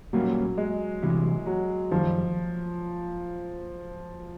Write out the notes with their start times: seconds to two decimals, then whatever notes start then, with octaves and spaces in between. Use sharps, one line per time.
0.13 A#2 F#3 G3 A#3 C#4
0.57 G#3
1.03 E2 C3 E3 G3
1.46 F#3
1.91 F#2 D#3 F3 G3